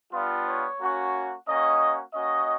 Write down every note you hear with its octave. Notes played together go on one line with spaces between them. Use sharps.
G3 B3 D4 F4
C#5
A#3 C#4 F#4
A#3 C#4 F#4 D#5
A#3 C#4 F#4 D#5